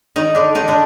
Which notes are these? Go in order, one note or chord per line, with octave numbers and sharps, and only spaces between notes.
D#3 D#4
D3 D4
D#3 D#4
D3 D4